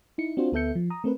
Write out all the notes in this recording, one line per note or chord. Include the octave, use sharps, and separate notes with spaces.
D#4 E4 C#7
C4 D4 F4 F#4 C5
D2 B3 A4 E5 G6 C#7
F3
A#5 D#6
A3 C4 A#4 B4